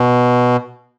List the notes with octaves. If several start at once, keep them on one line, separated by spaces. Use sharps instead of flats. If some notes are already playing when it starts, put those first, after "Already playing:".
Already playing: B2